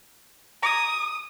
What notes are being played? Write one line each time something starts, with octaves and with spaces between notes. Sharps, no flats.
A#5 D6 D#6 G#6